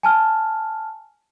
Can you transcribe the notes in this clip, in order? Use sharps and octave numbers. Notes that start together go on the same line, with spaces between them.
G#5 A5 F6